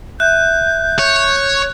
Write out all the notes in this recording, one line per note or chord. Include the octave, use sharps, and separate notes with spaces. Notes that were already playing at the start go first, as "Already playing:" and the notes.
E5 F#6 G6
C#5